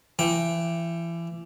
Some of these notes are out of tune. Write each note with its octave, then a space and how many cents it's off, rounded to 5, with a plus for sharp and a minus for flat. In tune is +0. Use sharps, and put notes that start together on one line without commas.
E3 +30 G5 +0